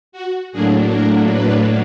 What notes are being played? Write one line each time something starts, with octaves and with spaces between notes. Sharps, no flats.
F#4
A2 F#3 A#3 D4 G#4
A#4
B4